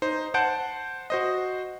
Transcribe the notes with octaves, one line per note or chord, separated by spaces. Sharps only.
D#4 C5
C5 F#5 A5 G6 D7
F#4 C5 D#5